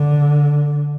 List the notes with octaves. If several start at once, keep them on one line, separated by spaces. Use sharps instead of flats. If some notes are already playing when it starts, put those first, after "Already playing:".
Already playing: D3